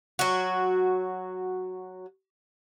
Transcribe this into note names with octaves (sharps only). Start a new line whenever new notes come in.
F#3 F#4